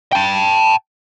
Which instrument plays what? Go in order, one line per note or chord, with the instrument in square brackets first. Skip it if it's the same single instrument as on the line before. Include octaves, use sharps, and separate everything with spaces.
[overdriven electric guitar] G5 A5